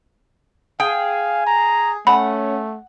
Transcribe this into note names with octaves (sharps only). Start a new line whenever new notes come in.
G#4 F5 G5
A#5
A3 C#4 F#5 B5